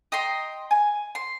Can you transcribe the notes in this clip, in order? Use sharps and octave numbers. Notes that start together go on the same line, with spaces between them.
D#5 G5 A#5 C6
G#5
C6